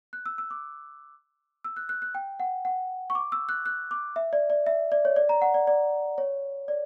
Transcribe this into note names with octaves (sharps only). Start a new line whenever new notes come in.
F#6
E6
E6
D6
E6
F#6
F#6
F#6
G5
F#5
F#5
C#6
D6
E6
F#6
F#6
D6
E5
D5
D5
E5
D5
C#5
D5
A#5
F#5
D5
D5
C#5
D5